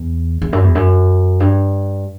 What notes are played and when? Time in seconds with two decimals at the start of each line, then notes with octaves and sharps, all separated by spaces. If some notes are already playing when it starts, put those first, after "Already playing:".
Already playing: E2
0.42 E2
0.53 F#2
0.64 E2
0.75 F#2
1.40 G2